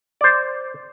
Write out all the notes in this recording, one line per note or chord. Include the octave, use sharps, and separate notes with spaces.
C5 D5